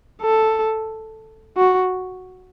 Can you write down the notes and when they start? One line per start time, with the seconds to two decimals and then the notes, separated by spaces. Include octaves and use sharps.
0.22 A4
1.57 F#4